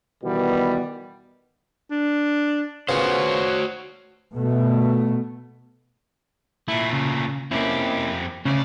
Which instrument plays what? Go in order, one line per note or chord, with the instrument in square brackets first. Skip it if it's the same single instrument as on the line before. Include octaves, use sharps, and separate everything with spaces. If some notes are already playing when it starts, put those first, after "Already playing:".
[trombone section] B2 D#3 E3 G3 B3
[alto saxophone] D4
[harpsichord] A#2 C#3 B3 [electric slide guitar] F#4 C5 [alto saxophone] C#5
[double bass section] B2 A3
[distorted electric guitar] A#2 A3 [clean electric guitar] E4
[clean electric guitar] C#3
[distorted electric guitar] F2 G4 [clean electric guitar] A#3 C#4 E4
[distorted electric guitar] D2 D5 [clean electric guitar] C#3 C#4